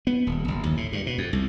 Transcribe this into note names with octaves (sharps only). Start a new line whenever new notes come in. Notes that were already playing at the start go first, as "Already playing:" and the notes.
B3
D#1
F#1
D#2
A2
G2
B2
F2
C2